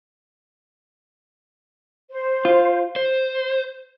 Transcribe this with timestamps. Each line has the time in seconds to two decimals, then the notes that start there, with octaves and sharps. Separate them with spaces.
2.11 C5
2.45 F4
2.96 C5